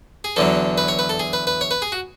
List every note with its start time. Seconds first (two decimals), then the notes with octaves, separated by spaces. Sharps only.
0.24 G#4
0.36 E2 D3 F#3 A4
0.78 B4
0.88 C#5
0.99 B4
1.09 A4
1.19 G#4
1.33 B4
1.47 B4
1.61 C#5
1.71 B4
1.82 G#4
1.92 F#4